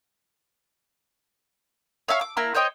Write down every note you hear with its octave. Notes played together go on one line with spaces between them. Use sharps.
C#5 E5 F5 C#6
D6
A#3 E4 A#5
C5 C#5 D#5 G5